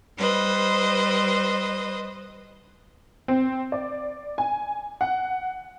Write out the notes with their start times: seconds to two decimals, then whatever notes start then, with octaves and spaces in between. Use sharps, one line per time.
0.17 G3 B4 C5 D#5
3.28 C4
3.72 D5
4.38 G#5
5.01 F#5